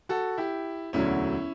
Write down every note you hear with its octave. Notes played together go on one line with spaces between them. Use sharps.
F#4 A4
E4 G4
E1 D2 D3 F#3 C#4 E4